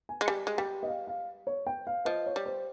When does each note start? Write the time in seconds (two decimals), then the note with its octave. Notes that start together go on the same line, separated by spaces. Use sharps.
0.09 G#5
0.21 G#3
0.28 G3 G#5
0.47 G#3
0.58 G3 G5
0.83 D#5
0.88 F5
1.07 F5
1.47 C#5
1.67 G5
1.87 F5
2.05 F3 D#5
2.26 C#5
2.36 G3
2.46 C5